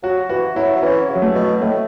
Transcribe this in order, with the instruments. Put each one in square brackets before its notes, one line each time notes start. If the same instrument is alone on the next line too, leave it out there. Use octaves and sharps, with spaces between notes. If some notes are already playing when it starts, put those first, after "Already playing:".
[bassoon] F#3 [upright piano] F#4
[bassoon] E3 [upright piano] F#4
[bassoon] F#3 [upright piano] E4
[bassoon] F#3
[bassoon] E3 [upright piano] C#4
[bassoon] C#3
[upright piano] F#3
A3
[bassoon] B2
[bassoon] A2 [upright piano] A3